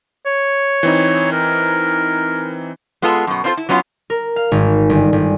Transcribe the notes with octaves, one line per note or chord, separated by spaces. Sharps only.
C#5
E3 C4 D#4
A#4
G#3 B3 F4 G#4 A4
F#2 B2
C4 D4 F4 A4 C5
E4
F#3 B3 C#4 E4 F4
A#4
F5
G#1
G1
G1